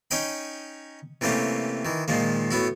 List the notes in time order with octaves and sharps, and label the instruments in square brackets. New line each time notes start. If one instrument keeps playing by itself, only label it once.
[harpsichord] C#4 D#4 C#5 D#5 G5 B5
C3 E3 A3 A#3 C#4 G4
D#3 E3
A#2 D#3 F3 G#3 A#3
A2 B3 E4 F#4